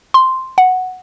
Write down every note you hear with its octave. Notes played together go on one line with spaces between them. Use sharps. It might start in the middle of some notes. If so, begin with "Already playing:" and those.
C6
F#5